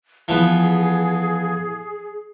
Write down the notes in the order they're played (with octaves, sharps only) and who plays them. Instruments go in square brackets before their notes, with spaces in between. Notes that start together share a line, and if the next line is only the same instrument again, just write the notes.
[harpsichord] E3 F3 B3 [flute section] G#4